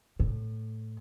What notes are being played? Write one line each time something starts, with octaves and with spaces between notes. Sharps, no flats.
A2